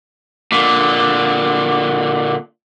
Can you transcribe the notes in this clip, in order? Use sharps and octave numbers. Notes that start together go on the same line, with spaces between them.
A#2 D3